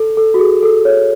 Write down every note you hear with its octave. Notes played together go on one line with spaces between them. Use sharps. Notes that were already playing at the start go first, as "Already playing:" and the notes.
Already playing: A4
A4
F#4
G#4
A4
C#5